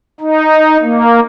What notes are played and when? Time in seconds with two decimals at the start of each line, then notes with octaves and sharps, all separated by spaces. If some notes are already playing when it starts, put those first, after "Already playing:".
0.21 D#4
0.82 A#3